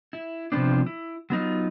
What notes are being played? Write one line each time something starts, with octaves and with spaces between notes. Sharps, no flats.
E4
C3 F3 B3 C4 D4
E4
F#3 B3 D#4 F4